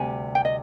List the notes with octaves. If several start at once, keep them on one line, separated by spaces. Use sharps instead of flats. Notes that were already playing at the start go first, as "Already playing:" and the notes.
Already playing: D2 C3 G3 G#5
G5
D#5